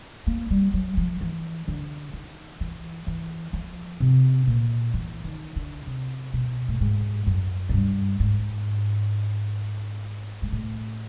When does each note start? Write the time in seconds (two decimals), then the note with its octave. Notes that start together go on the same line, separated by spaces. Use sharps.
0.27 A#3
0.51 G3
0.74 F#3
0.97 F3
1.21 E3
1.68 D3
2.13 D#3
2.61 E3
3.07 E3
3.53 F3
4.00 C3
4.47 A#2
4.94 E3
5.24 D#3
5.56 D3
5.87 C3
6.34 B2
6.68 A2
6.80 G#2
7.27 F#2
7.69 G#2
7.73 G2
8.20 G#2
10.42 G#2
10.52 A2